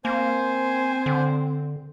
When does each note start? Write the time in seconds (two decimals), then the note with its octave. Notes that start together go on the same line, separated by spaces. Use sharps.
0.05 A#3 C4 C5 G#5
1.06 D3